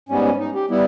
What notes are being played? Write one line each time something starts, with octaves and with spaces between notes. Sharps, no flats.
G#2 G3 B3 C#4
C#4
D#4
G4
G3 B3 E4